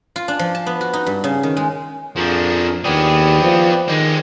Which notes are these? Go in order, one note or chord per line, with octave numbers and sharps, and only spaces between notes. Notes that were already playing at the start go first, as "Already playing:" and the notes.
F4
D4
F3
A5
B3
F#4
D#4
G2
C#3
D#3
G#3
F2 F3 D4 F#4 G#4 A#4
D#2 B3 G#4 B4 D5 G5
F3
D#3 G#3 G4